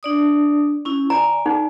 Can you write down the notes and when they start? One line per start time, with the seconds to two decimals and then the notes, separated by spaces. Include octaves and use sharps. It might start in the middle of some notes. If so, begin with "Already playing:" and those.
0.03 D4 D5 D#6
0.85 C#4 E4
1.10 D5 G#5 A#5
1.46 D#4